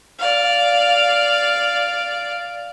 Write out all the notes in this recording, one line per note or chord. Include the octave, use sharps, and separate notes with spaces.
D5 F5